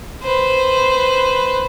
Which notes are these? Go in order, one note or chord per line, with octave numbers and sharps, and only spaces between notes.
B4 C5